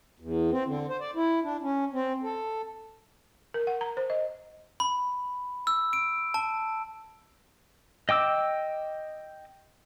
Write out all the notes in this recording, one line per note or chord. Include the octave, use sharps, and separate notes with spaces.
E2
C4
D3
C5
D5
E4
D4
C#4
C4
A4
A#4
F#5
A#5
C5
D#5
B5
E6
D7
A5
D#5 G5 D6 E6